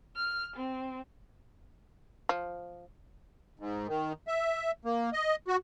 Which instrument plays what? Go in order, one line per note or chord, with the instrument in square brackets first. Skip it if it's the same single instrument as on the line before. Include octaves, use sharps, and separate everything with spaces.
[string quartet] F6
C4
[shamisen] F3
[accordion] G#2
D#3
E5
A#3
D#5
F#4